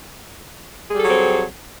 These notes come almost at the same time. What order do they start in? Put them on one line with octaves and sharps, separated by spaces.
G#4 G3 A4 F#3 C4